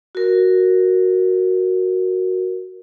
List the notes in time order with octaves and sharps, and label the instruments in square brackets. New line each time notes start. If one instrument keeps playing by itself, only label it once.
[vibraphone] F#4 A#4